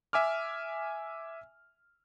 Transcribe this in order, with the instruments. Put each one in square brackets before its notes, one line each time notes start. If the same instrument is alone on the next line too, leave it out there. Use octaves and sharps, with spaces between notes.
[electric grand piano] E5 G#5 D6 F6